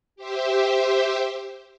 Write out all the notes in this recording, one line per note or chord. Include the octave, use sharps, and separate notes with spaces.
G4 C5 E5